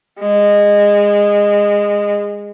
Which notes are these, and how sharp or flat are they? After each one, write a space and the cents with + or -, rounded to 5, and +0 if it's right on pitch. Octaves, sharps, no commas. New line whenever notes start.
G#3 -20